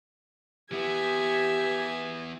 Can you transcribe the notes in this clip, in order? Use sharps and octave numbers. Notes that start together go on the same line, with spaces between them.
E3 B3 G4 E5 G#5